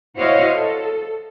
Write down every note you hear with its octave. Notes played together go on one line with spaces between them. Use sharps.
E4 F#4 C5 C#5 D#5 F5
A4